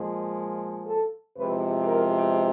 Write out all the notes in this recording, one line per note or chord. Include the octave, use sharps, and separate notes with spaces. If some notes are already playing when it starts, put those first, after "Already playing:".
Already playing: A#2 F3 G#3
A4
E2 C3 F3 G#3 B4
A#4